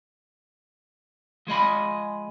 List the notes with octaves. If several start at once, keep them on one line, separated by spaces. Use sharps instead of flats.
F3 G#3 D#5 B5